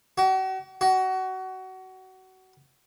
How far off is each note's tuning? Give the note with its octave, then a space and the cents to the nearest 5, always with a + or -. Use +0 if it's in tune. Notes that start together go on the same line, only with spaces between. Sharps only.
F#4 +40
F#4 +25